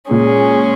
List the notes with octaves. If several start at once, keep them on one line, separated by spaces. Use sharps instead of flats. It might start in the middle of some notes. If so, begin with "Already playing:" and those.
A#2 G#3 C#4 G#4